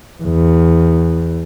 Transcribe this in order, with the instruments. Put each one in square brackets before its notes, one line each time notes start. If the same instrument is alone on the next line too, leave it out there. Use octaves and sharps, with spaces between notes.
[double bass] E2